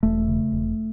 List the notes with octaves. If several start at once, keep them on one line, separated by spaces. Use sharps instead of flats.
E1 A3
C#3
E1